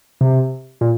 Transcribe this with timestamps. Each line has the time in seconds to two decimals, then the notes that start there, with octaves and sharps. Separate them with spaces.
0.21 C3
0.81 A#2